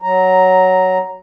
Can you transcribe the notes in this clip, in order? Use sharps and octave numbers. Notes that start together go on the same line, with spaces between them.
F#3 A#5